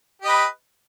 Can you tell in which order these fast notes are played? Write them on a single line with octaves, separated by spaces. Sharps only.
G4 D#5 B4